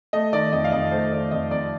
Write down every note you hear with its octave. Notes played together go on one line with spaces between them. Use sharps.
A3 D#5
D#3 D5
F2 D#5
F5
F2 D#5
A3 C5
D#3 D5
F2 D#5
F2 D5